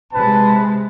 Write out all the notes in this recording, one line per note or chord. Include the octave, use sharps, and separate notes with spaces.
C3 G#3 B4 A5